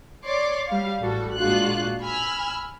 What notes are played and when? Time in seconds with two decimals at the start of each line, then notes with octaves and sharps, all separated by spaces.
0.24 C#5 D5 C6 D6
0.68 G3 F5
1.00 A1 G3 F#4 A4
1.37 A#2 G#3 D4 F4 F#4 F#6
2.02 G#5 B5 E6 F6